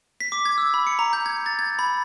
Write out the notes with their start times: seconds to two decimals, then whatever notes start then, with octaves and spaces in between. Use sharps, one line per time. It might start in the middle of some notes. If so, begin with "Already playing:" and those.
0.21 B6
0.32 D6
0.45 G#6
0.58 E6
0.74 B5
0.87 C#7
0.99 A#5
1.13 G6
1.26 G#6
1.46 A6
1.59 G#6
1.79 B5